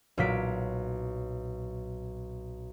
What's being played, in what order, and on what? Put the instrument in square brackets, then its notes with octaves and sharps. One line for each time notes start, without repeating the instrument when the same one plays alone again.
[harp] B1 A#2 F#3 B6 D7